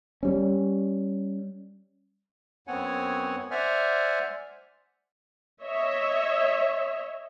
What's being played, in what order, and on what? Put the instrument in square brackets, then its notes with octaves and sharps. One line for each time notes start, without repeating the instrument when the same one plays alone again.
[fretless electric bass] G3 C#4
[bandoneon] F#2 B3 C4 C#5 F#5 G#5
C5 D5 E5 F#5 G#5 F6
[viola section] C#5 D#5 E5